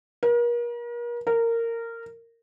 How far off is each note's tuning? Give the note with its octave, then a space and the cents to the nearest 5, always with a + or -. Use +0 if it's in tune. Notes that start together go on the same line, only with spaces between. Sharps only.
A#4 +40
A#4 -15